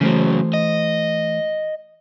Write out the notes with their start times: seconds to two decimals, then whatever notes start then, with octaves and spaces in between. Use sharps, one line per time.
0.01 C#3 E3 F#3 A3 C5
0.54 D#5